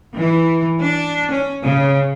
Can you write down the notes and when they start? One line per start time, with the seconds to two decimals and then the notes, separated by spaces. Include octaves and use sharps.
0.16 E3
0.81 D4
1.30 C#4
1.63 C#3